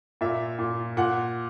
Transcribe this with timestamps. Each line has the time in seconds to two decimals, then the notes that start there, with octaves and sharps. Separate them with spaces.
0.21 A#2 E5
0.59 A#2
0.97 A#2 F#5